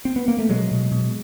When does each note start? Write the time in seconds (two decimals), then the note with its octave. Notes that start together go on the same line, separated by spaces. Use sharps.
0.05 C4
0.16 B3
0.28 A#3
0.39 A3
0.49 B2 F#3 G#3
0.71 B2
0.92 B2